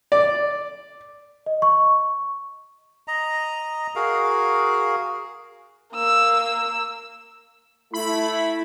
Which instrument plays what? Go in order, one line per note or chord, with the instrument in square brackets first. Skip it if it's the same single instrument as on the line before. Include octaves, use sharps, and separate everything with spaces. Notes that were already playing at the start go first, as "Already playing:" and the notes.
[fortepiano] D5
[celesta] D#5
C#6
[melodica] D#5 A#5
F#4 G#4 A#4 F5
[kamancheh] A#3 E6
[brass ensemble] A3 E4 [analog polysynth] B5